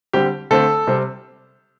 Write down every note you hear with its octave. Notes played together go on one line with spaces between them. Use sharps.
D3 G3 C4 G4
D3 A3 C4 A4
C3 G3 C4